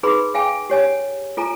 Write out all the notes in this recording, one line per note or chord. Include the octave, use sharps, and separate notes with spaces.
D#4 G#4 B4 B5 C6
G#4 F5 G5 G#5
G4 C#5 G#5
F4 A4 G#5 A#5